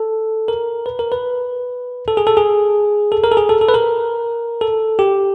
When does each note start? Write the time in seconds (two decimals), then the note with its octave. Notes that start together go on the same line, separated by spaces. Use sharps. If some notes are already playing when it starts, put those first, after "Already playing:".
Already playing: A4
0.48 A#4
0.86 B4
0.99 A#4
1.12 B4
2.08 A4
2.17 G#4
2.27 A4
2.37 G#4
3.12 A4
3.24 A#4
3.32 A4
3.37 G#4
3.49 A4
3.61 A4
3.69 B4
3.74 A#4
4.61 A4
4.99 G4